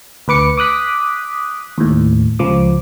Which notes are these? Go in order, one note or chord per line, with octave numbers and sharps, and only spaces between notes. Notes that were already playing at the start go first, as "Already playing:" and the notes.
D2 B4 D6 C#7
D6 D#6 F#6 B6
D#2 A2
C#2 F3 D6